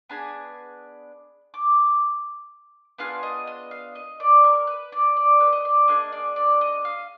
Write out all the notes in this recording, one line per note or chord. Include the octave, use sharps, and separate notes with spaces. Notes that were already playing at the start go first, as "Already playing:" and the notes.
B3 D4 G#4 B5
D6
B3 D4 F4 G#4 F5
D#5
D#5
F5
D#5
D5
A#4
B4
D5
D5
B4
D#5
D5
A#3 D4 G#4 D#5
D5
D5
D#5
F5